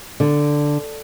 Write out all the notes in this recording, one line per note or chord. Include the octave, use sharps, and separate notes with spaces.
D3